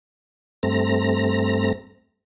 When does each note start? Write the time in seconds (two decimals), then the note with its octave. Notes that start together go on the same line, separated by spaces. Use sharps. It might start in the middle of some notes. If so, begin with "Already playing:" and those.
0.63 G2 A3 C4 A#5